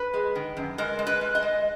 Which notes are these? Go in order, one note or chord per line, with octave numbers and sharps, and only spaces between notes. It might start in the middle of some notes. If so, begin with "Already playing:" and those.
Already playing: B4
G#3
D#3
F#2
G#3 A#4
G#3
B4
G#3
D#5
G#3